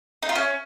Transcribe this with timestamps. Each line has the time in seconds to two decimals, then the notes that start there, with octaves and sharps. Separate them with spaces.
0.23 D#4
0.29 F4
0.35 C#4